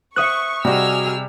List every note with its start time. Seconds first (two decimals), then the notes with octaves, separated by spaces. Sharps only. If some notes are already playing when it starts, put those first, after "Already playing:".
0.16 C5 E5 C#6 D#6 F#6
0.65 C3 G3 F#4 G#4 D#5 E6 F6